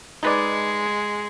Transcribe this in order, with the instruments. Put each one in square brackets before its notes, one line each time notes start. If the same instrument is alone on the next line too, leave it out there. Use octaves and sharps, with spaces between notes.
[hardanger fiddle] G#3 [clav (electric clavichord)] D#4 B4 D5